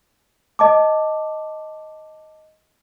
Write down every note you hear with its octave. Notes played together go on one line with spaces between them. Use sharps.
D#5 A5 D6